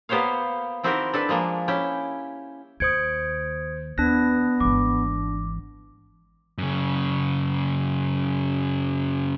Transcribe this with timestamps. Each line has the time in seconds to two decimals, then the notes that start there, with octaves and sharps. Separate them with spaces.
0.09 A#3 B3 G4 C5 C#5 F5
0.84 D#3 C4 E4 F#4 G4 A#4
1.14 D4 A4 B4
1.29 F3 G#3 A#3
1.68 C#4 E4 G4
2.80 D#2 C5 D#6 G#6 C#7 D7
3.98 D#2 B3 D4 F#6 A#6
4.60 G#1 E3 D6
6.58 F#2 C#3